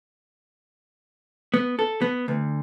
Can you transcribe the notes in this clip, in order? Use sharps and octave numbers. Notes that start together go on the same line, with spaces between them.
B3
A4
B3
D2